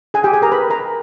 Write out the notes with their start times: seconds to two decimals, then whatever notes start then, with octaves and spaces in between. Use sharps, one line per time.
0.14 G#4 G#5
0.23 G4 G5
0.33 G#4 G#5
0.42 A#4 A#5
0.52 B4 B5
0.70 A#4 A#5